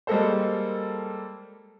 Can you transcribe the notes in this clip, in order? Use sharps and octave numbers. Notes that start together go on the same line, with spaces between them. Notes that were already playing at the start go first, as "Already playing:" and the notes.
G3 G#3 A#3 A4 C5